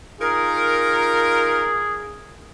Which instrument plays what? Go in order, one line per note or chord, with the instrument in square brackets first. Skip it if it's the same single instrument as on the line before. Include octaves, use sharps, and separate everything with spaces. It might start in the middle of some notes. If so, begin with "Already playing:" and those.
[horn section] D#4 F4 A#4 [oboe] G#4